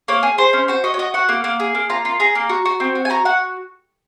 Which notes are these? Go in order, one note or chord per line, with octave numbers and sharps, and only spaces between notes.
A#3 C#5
G#4
G#4 C5
C#4
F#4 C5
F#4 D#5
C#5
F#4 D#5
F#4 F#5
A#3
A#3
G#4
A#3
F4 A#5
F4
G#4 A#5
A#3
F#4
F#4
C4
F#4
G#5
F#4 A#5
F#4 F#5